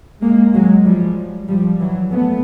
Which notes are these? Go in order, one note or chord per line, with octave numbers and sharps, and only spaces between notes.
G#3 A#3
F#3 G#3
F3 G3
F3 G3
E3 F#3
A3 B3